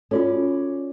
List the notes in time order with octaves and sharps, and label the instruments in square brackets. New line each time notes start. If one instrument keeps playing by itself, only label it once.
[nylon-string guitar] C#4 D5 [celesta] F4 F#4 A4